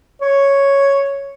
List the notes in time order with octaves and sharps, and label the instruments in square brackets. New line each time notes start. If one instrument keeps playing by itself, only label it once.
[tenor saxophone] C#5